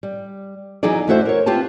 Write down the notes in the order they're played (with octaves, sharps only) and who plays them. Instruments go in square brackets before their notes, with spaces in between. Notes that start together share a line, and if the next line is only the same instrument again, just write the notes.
[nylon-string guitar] G3
E3 F#3 B3 D#4 G#4 D5
E2 A3 E4 F#4 C5 E5
A#4 C#5
C4 F4 G4 B4 A5